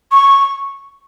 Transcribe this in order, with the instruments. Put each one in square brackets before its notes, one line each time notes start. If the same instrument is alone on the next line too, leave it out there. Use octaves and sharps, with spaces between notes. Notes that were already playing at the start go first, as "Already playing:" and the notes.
[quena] C#6